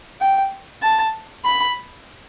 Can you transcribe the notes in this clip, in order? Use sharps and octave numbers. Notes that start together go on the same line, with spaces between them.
G5
A5
B5